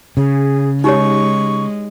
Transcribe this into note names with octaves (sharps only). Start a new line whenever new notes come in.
C#3 G#4
G#3 D#4 G4 C#5 C#6